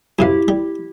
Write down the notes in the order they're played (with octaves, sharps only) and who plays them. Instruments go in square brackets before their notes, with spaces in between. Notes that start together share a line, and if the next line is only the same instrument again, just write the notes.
[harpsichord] F#2 C3 F5 [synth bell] E4 G4
[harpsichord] G3